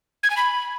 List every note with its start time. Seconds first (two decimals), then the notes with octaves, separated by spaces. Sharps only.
0.23 G#6
0.30 G#5
0.37 B5